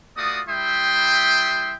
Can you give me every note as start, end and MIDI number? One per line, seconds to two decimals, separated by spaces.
0.17 0.41 57
0.17 0.41 65
0.17 0.41 66
0.17 0.41 74
0.17 0.41 87
0.48 1.75 55
0.48 1.75 64
0.48 1.75 76
0.48 1.75 79
0.48 1.75 84
0.48 1.75 87